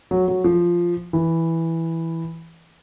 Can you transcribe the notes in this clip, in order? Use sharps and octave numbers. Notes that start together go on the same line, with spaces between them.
F#3
F#3
F3
E3